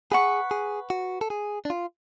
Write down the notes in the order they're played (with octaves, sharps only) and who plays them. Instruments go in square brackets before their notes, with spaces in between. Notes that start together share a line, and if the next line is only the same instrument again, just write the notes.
[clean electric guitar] G#4 [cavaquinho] B4 F#5 C#6
[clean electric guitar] G#4
F#4
A4
G#4
D4
F4